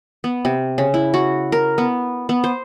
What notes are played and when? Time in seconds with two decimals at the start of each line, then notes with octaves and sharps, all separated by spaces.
0.24 B3
0.45 C3
0.78 C#3
0.94 E4
1.14 F#4
1.52 A#4
1.78 B3
2.29 B3
2.44 C5